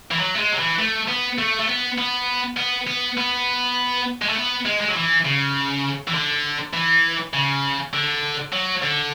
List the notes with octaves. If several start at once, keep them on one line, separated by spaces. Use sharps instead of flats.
E3
F#3
A3
G#3
F#3
E3
A3
B3
A3
A3
B3
B3
B3
B3
B3
G#3
A3
B3
G#3
G#3
F#3
E3
C#3
E3
D3
E3
C#3
D3
F#3
D3